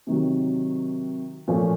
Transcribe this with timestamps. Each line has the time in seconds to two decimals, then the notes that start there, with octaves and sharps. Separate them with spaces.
0.07 C3 D#3 F#3
1.48 A#2 F3 A3 C#4